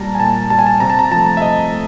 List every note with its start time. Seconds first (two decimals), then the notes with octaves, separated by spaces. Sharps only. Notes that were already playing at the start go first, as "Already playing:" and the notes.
Already playing: A#2 G3 A5 A#5
0.15 G#5
0.20 A#2 A5
0.50 G3 A5
0.59 G#5
0.67 A5
0.80 C3 A#5
0.90 A5
0.99 A#5
1.11 F3 A3 A5
1.37 E5
1.42 C3 D#5
1.72 A3